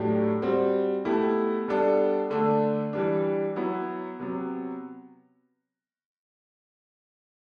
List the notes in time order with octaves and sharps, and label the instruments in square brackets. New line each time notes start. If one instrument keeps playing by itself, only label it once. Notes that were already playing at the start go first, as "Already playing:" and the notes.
Already playing: [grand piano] A2 F#3 A3 D4 G4
G3 C4 F#4
B2 A3 E4 G4
B2 G3 B3 D4 A4
D3 A3 D4
E3 G3 D4
F#3 B3 E4
C3 F#3 B3